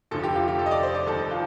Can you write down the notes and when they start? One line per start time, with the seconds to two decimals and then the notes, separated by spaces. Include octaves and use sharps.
0.11 F1 F2 D3 F3 A4
0.24 G4
0.35 F4
0.48 G4
0.59 A4
0.66 D#5
0.71 D5
0.83 C5
0.95 D5
1.07 F1 D#2 D#3 A4
1.31 F4